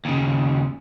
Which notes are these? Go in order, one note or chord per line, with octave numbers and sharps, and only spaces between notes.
D#2 C#3